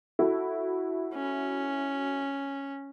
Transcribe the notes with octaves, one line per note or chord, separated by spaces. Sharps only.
E4 F#4 A4
C#4